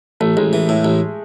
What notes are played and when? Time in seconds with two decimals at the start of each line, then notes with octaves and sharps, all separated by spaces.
0.20 A1 A3
0.37 A1 G#3
0.53 E3
0.69 A2
0.85 A1